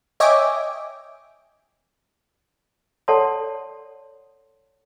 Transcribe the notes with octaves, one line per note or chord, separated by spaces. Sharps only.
C#5 D#5 E5 G5 G#5 D6
A4 C#5 D5 F#5 A5 C6